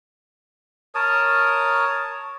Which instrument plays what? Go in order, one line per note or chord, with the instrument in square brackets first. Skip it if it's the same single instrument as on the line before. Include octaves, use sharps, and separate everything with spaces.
[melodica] A#4 C#5 A5 D#6